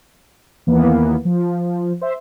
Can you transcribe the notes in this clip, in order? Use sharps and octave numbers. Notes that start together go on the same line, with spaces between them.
D#2 E3 A#3 B3
F3
C5 E5